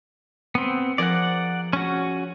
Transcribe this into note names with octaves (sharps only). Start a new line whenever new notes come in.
B3 C4
F3 G#4 A#4 D5 F#5
C#4 F#4